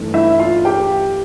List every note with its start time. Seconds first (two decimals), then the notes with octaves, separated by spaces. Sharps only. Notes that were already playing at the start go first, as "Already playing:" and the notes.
Already playing: G2 E3 A3
0.14 E4 E5
0.39 F4 F5
0.65 G4 G5